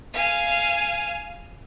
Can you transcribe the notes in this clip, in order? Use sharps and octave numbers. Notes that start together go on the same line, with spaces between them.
F5 G#5